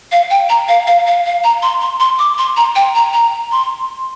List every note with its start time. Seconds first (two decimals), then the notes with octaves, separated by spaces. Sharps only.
0.12 F5
0.31 G5
0.50 A#5
0.69 F5
0.87 F5
1.07 F5
1.26 F5
1.44 A#5
1.63 C6
1.81 C6
2.00 C6
2.19 D6
2.38 C6
2.57 A#5
2.76 G5
2.95 A#5
3.13 A#5
3.52 C6